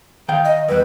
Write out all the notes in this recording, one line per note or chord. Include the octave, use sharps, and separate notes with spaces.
D#3 F5 G5
D#5
E2 G3 B4